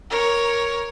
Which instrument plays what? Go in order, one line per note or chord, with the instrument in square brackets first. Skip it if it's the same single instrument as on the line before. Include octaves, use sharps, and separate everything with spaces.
[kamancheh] A#4 C#5